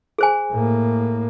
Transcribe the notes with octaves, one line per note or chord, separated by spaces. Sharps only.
G#4 C5 G#5
A2 A#3